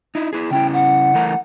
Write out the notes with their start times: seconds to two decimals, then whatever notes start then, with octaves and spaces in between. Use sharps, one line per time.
0.15 D#4 E4
0.33 E4 G#4
0.51 C#3 C#4 E4 G5
0.74 F#5
1.14 E3 A3 A#4